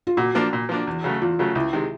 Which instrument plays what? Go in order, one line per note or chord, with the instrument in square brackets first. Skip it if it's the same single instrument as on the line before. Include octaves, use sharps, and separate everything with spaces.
[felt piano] F4
[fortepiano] A#2 [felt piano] F#4
[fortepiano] F3 A#3 D4
A#2
F3 A#3 D4
E2
C#3 F#3 A3
[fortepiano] E2 [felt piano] F4
[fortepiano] C#3 F#3 A3
[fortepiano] C#2 [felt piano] E4
[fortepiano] C3 D#3 G#3